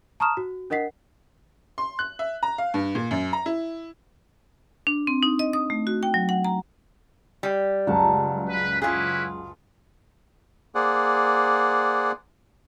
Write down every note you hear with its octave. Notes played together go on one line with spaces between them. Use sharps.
A5 A#5 C#6 D#6 F6 E7
F#4
D4 A#4 D#5 F#5 B6 C7
C6
F#6
E5
A#5
F5
G2
A#2
F#2
A#5
E4
D4
C4
D#4
D#5
D#6
A3
F#4
G5
F#3
F#5
A#5
G3
C#2 F#2 C#3 A#4 F#5 A5
B4
C#4 E4 F4 G#4 B4
A#3 G#4 C5 D5 F#5